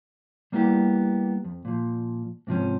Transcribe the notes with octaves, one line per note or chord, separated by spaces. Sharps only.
G3 A#3 B3 E4 G4
F2
A#2 F3
G#2 C3 F3 C#4